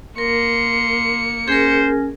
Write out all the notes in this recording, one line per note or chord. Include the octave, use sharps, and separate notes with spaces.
A#3 A#4 C6 C#7
C#4 G#4 A#4 C5